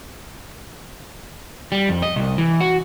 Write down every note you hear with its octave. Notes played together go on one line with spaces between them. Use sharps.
G3
F2
D#5
C2
E3
F#4